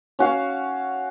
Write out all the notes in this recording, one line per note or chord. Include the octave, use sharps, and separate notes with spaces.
C#4 F#4 F5